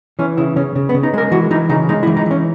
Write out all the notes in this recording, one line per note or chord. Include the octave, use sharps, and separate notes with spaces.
E3 C#4
C#3 E4
C#3 C#4
C#3
B3
C#3
D#4
G#3 A#4
E3 F#4
E3 D#4
C#3 D#4
G#3 D#4
E4
E3
D#4
E3 C#4